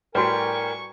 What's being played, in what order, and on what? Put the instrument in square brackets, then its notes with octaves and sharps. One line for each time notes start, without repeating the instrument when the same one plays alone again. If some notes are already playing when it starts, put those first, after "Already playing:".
[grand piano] A2 G3 G4 [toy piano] F#4 B4 [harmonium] A#4 G#5 [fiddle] C#6